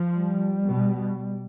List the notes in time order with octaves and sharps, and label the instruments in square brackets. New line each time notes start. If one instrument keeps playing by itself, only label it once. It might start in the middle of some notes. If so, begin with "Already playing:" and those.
Already playing: [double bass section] F3
[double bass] G3
[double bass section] B2